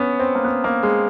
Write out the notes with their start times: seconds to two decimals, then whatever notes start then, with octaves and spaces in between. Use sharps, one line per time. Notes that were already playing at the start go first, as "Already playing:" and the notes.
Already playing: B3 C#4
0.19 C4
0.35 A#3
0.45 B3
0.64 A#3
0.83 G#3